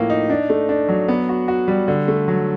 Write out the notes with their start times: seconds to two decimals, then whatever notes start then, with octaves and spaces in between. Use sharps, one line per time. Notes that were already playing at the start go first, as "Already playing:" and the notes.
Already playing: A2 F3 A#3
0.10 D#4
0.30 D4
0.50 A3
0.69 D4
0.89 F#3
1.08 B3
1.29 F#4
1.48 F#4
1.68 G3
1.88 D3
2.08 A3
2.28 F#3